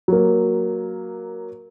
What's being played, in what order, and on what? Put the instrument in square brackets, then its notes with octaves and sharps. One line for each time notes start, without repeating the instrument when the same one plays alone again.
[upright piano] F#3 A#3